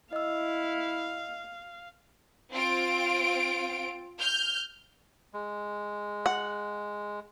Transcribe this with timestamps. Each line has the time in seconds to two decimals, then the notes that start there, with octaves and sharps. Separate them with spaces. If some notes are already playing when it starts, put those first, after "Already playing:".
0.13 E4 D#5 F5 E6
2.52 C4 F4 D7
4.20 F6 G6
5.34 G#3
6.26 F#5